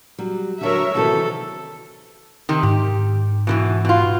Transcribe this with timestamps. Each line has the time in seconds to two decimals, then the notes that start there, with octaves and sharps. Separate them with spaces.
0.19 F#3 G3
0.61 D3 F#3 A#4 C#5 E5
0.95 C3 D#3 E3 F#3 A4
2.49 C3 D#3
2.63 G#2 G4
3.47 B2 D#3 E3
3.85 B2 F4